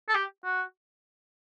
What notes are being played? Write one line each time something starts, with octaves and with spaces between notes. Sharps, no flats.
A4
G4
F#4